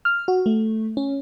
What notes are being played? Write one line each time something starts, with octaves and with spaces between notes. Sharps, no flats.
F6
F#4
A3
C#4